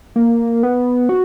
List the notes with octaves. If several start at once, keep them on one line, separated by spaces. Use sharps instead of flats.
A#3
B3
F#4